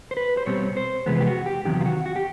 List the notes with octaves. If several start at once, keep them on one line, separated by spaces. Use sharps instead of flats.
C5
B4
C5
B2 G3 C4 C#5
C5
F2 C3 E3 G#3 B3 B4
G4
F#4
G4
E2 C3 D#3 F#3 G4
F4
F#4
F#4
G4